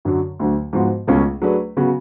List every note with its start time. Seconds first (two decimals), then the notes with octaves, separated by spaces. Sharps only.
0.05 F#2 D3 F#3
0.39 D2 D3 F#3
0.73 G#2 F3 B3 F#4
1.07 C#2 B2 A3 C#4 F4
1.42 F#3 A3 D4 G#4 B4
1.77 C#3 F#3 B3 F#4